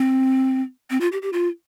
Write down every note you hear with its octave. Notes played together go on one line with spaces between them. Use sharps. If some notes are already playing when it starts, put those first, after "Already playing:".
Already playing: C4
C4
F4
G4
G4
F4